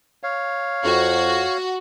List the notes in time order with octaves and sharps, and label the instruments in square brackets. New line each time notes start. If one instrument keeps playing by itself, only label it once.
[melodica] C#5 F5
[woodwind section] F2 [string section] F#4